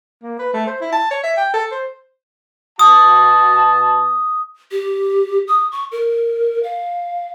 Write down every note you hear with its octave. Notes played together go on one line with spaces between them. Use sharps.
A#3
B4
A3
C5
E4
A5
C#5
E5
G5
A4
C5
B2 F#4 A5 D#6
G4
D#6
C#6
A#4
F5